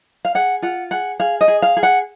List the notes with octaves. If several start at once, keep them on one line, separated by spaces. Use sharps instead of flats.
F5
G#4 F#5
F4 F#5
G#4 F#5
G#4 F5
D#5
G#4
F5
G#4
F#5